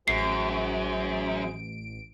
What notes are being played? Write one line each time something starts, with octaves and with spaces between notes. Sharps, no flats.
A1 F#2 F#4 G#4 C5 C7 D7